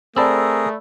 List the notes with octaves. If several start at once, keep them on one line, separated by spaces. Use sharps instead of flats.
A3 C4 G#4 A#4 D5 A5 B5 E6